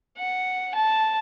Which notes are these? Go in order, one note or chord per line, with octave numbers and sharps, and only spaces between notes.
F#5
A5